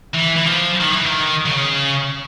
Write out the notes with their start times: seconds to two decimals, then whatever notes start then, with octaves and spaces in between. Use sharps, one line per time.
0.14 E3
0.37 E3
0.47 F3
0.80 D#3
0.93 E3
1.06 D#3
1.46 C#3